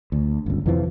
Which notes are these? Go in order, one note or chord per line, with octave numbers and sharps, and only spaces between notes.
D2
G1 C#2
F2 C3 E3 F3